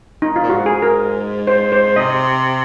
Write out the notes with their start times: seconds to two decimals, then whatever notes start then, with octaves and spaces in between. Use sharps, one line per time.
0.22 D#4
0.36 F4
0.43 A#2
0.50 G#2 F#4
0.66 G#4
0.82 A#4
1.47 C5
1.72 C5
1.96 C3 D#5